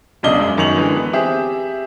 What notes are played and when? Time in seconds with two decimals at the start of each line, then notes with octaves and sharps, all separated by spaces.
0.23 E1 B1 C#3 D4 D#5 G7
0.39 F#2 G#3
0.58 F#2 D#3 C#6 F7 F#7
0.75 D3 E3 G#3
0.96 B3
1.13 C4 G4 G#4 E5